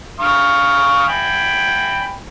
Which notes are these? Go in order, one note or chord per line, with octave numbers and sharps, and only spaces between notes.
F5 C#6 D#6
G5 G#5 B5